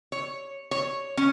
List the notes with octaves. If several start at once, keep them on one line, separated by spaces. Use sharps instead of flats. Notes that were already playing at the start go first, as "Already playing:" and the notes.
C#5
C#5
C#4